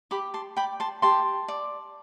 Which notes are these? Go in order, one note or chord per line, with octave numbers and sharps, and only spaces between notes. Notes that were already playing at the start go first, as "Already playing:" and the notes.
G4 B5 D6
A5 C6
D5 G5 B5
A5 C6
G4 A5 C6
D5